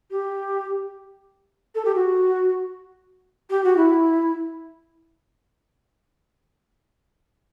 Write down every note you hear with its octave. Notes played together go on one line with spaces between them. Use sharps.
G4
A4
G4
F#4
G4
F#4
E4